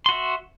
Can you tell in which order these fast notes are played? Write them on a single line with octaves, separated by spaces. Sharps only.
C6 F#4 E5